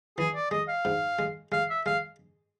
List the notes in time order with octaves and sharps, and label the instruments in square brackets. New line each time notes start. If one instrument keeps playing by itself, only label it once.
[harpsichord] E3 [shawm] G#4
[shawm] D5
[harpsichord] G#3 [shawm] D#5
[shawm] F5
[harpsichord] G#2
G#3
[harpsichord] G#3 [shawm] F5
[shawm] E5
[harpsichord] G#3 [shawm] F5